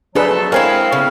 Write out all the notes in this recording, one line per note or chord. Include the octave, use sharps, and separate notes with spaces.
B2 F3 F#3 A3 D4 G#4 A4 B4
G#3 C4 E4 A#4 C#5 F5 G#5
A2 C#3 B3 F6